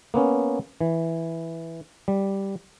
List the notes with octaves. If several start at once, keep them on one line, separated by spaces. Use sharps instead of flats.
A#3 B3 C#4
E3
G3